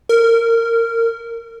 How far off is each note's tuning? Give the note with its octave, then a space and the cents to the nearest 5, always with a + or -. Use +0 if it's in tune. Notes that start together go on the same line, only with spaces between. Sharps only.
A#4 -20